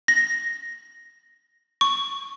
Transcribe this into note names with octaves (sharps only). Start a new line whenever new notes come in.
A#6
C#6